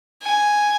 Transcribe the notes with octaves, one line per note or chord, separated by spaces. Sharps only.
G#5